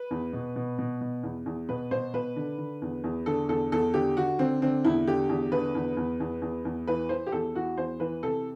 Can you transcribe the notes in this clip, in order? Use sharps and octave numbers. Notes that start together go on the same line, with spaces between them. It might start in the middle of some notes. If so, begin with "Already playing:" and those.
Already playing: B4
E2
B2
B2
B2
B2
E2
E2
B2 B4
B2 C5
B2 B4
D3
D3
E2
E2
D3 A4
E2 A4
E2 A4
D3 G4
D3 F#4
D3 C4
D3 C4
E2 E4
D3 G4
E2
D3 B4
E2
E2
E2
E2
E2
E3 B4
E3 C5
G4
E2 A4
E3 F#4
E2 C5
E3 B4
C3 A4